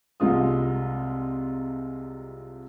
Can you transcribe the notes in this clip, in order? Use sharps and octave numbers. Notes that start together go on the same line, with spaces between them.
C2 C3 G#3 F4 D#6